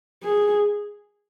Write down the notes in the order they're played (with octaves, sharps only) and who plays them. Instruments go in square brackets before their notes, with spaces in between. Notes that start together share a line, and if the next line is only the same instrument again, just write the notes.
[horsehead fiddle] G#4